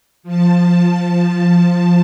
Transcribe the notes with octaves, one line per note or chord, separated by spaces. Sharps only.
F3 A5